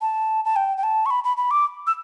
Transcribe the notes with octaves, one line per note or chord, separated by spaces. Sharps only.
A5
A5
G5
G5
A5
C#6
B5
B5
B5
D6
E6